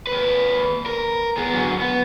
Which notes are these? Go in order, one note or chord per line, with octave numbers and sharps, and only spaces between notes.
D#2 B4
A#4
B3 G#4
D3 F#3
B3